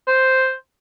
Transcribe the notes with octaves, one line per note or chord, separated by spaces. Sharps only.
C5